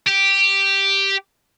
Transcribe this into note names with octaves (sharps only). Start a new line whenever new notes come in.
G4